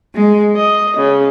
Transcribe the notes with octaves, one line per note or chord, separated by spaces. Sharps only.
G#3
D#5
C#3